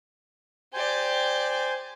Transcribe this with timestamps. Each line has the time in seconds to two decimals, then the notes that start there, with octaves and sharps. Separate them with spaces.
0.73 G4 C5 D5 G#5